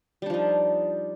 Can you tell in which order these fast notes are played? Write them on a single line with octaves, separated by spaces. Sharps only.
G3 D4 F3 D#4